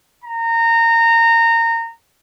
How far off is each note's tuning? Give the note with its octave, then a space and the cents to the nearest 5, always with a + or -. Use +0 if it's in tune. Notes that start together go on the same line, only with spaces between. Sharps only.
A#5 -20